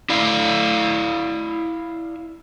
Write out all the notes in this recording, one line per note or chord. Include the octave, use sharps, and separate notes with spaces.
E4 D5 F5